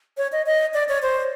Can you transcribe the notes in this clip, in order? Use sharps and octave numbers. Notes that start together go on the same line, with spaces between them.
C#5
D#5
D#5
D5
C#5
C5